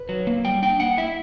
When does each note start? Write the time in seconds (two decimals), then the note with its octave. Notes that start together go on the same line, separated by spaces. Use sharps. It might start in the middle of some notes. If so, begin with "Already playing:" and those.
Already playing: B4
0.09 F#3
0.27 A#3
0.45 G3 G5
0.62 D4 G5
0.80 A#3 F#5
0.98 E4 E5